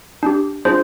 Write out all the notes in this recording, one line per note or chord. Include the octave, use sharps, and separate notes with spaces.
D4 G4
D4 F4 G#4 C5